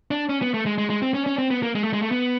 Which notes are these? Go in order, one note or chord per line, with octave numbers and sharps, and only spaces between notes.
D4
C#4
B3
A3
G#3
G#3
G#3
C4
C#4
C#4
C4
B3
A#3
G#3
A3
G#3
A3
B3